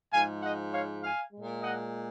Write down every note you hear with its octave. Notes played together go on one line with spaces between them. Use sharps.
G#2 F3 G#3 F5 G#5
D#5 F#5
C#5 F5
F5 G#5
A#2 G#3
D#5 F#5